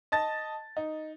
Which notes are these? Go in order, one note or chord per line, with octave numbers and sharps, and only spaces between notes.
D#5 A5 A6
D#4